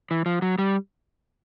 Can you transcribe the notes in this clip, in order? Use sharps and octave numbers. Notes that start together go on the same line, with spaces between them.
E3
F3
F#3
G3